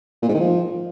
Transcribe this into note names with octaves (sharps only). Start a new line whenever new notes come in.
A#2
G#2
D#3
F3